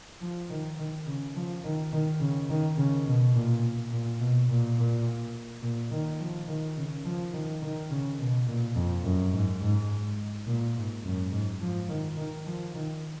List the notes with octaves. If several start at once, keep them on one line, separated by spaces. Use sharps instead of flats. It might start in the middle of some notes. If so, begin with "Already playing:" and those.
F3
D#3
D#3
C#3
F3
D#3
D#3
C#3
D#3
C#3
B2
A#2
A#2
B2
A#2
A#2
A#2
D#3
F3
D#3
C#3
F3
D#3
D#3
C#3
B2
A#2
F2
F#2
G#2
G#2
A#2
G#2
F#2
G#2
F3
D#3
D#3
F3
D#3